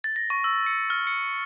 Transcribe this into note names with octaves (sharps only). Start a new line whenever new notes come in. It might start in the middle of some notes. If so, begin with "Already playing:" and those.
A6
A#6
C#6
E6
C#7
F6
C#7